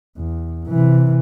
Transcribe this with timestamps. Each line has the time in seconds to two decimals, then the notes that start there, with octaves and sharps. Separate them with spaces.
0.17 E2
0.68 C3 E3